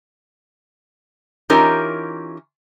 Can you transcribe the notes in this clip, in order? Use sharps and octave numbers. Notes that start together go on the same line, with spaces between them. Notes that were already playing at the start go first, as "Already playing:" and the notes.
E3 C#4 D#4 F4 G4 A#4